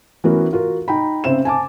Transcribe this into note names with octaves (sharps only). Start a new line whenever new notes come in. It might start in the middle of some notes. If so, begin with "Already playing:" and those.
E3 B3 C#4 F#4 A#4
F4 F#4 A#4
D#4 G5 B5
C#3 C4 C5 E5 E7
G#5 A5 D6